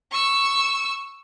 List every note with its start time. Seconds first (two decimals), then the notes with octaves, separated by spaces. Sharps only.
0.11 C#6 E6